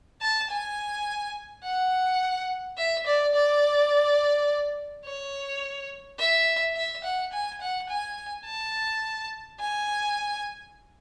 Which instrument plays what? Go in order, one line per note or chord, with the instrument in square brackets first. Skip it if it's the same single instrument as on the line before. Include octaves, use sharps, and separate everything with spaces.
[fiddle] A5
G#5
F#5
E5
D5
D5
C#5
E5
E5
F#5
G#5
F#5
G#5
A5
G#5